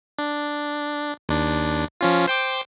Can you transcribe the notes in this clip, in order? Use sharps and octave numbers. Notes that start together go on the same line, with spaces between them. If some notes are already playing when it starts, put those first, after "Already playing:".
D4
D#2 D4
F3 C#4 F4
C5 G5 D6